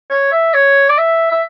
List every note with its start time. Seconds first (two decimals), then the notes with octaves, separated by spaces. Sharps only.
0.10 C#5
0.32 E5
0.54 C#5
0.89 D5
0.98 E5
1.31 E5